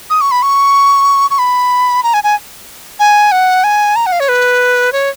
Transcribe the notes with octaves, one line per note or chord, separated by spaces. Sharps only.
D#6
C#6
B5
C#6
C#6
B5
A#5
G#5
G#5
G#5
F#5
G#5
A#5
F#5
F5
C#5
B4
C#5